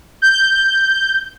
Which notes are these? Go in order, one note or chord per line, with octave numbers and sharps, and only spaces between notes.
G6